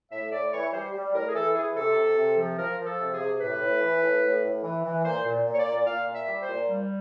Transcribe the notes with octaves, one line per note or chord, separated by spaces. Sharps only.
A2 E5
A2 D5
E3 C#5
G3 C5
G3
A2 A#4
G#4
E3 A4
E3 G#4
C3 A4
C3
C3
F3
F3 A#4
F3
A4
C3
G#4
C3
A2 B4
A2
E3
A2
A2
A2
E3
E3
A#2 C5
A#2
A#2
C#5
D5
A#2
A#2 F5
A#2
E5
G3
C5
A#2
G3